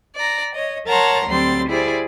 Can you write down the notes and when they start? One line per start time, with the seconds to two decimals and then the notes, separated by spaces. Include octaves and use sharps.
0.16 D5 A#5
0.54 C#5 D#5
0.87 A#4 C#5 F#5 A5 A#5 C6
1.27 D2 F#3 G3 C4 C6 A6
1.68 G3 E4 G#4 C5 D5